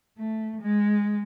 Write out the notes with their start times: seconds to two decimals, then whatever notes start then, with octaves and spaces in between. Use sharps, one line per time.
0.18 A3
0.61 G#3